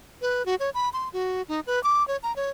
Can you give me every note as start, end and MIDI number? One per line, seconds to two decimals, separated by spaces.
0.22 0.45 71
0.46 0.55 66
0.60 0.70 73
0.74 0.89 83
0.93 1.09 84
1.13 1.42 66
1.48 1.60 63
1.67 1.82 71
1.84 2.06 86
2.08 2.17 73
2.23 2.34 82
2.36 2.50 73